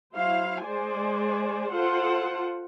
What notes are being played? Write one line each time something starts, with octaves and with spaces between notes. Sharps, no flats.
F#3 E4 C5 F5
G#3 C5 D5 G#5
F4 A4 C5 F#5